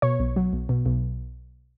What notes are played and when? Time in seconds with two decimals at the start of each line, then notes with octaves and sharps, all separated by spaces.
0.02 B2 C#5
0.20 B1
0.36 F#3
0.53 B1
0.69 B2
0.86 B1